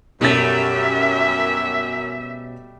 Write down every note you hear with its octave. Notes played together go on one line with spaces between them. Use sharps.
F#2 B2 G3 A3 C#4 E5 A6